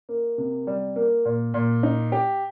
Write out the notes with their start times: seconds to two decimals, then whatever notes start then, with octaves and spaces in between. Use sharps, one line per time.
0.09 A#3
0.38 C3
0.67 G3
0.96 A#3
1.25 A#2
1.54 A#2
1.83 D#4
2.12 G4